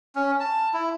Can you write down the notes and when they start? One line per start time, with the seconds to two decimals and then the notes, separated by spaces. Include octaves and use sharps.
0.15 C#4
0.40 A5
0.73 E4